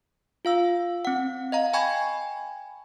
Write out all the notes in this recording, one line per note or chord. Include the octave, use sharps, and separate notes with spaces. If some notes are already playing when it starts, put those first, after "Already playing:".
F4 F5 E6
C4 F#5
D#5 F5 A#5
G5 G#5 B5 C#6 G#6